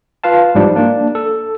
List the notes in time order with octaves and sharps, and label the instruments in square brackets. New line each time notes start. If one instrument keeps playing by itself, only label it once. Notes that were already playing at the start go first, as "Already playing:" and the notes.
[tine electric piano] F4 B4 F5 A5
G#2 F3 G3 D4
A#3 D4
A4